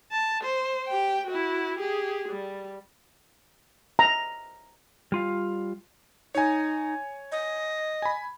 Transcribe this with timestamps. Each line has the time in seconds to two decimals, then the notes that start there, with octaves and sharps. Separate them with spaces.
0.12 A5
0.43 C5
0.88 G4 G5
1.27 E4 F#4
1.78 G4 G#4
2.29 G3
3.99 A#5
5.12 G3 F4 F5
6.35 D#4 C#5 G#5
7.32 D#5
8.02 G#5 B5